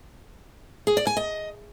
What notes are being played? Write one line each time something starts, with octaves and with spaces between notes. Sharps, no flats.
G#4
D5
G#5
D#5